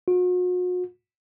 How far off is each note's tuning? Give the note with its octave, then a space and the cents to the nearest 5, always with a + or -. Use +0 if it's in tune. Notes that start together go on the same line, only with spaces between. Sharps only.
F#4 -40